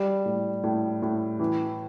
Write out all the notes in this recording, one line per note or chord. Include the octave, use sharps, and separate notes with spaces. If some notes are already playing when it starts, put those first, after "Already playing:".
Already playing: G3
A2
A2
A2
E3